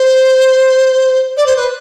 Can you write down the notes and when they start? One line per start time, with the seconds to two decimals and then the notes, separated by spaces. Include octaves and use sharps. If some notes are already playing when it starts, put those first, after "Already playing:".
Already playing: C5
1.37 D5
1.46 C5
1.56 B4